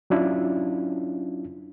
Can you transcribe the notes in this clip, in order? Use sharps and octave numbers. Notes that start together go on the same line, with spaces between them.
F#3 C#4 D4 E4 F4